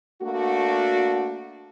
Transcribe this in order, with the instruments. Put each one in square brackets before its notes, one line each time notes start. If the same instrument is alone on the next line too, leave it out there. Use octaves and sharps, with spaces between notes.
[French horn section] A3 A#3 D4 F#4